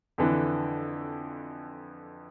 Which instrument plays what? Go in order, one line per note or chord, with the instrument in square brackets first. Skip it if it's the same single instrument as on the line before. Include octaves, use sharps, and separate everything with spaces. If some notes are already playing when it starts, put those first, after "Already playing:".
[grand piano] F2 D3 E3